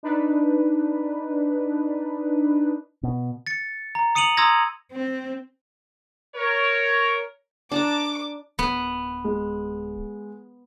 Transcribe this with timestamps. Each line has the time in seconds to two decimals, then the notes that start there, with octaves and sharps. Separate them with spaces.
0.03 D4 D#4 B4
3.03 B2
3.47 A6 C#7
3.95 A#5
4.15 D#6 C#7 D#7 F7 F#7
4.37 A#5 C6 D#6 E6 G#6 A#6
4.92 C4
6.36 A#4 C#5
7.72 D4 A5 A#5 D6
8.59 D1 B3
9.24 G#3